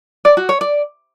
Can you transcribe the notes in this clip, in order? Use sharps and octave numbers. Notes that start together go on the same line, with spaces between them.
D5
F#4
C#5
D5